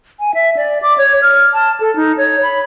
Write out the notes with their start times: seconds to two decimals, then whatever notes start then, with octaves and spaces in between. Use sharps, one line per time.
0.20 G#5
0.34 E5
0.57 D5
0.82 D6
0.98 C#5
1.22 F6
1.53 A5
1.80 A4
1.96 D#4
2.17 C#5
2.42 B5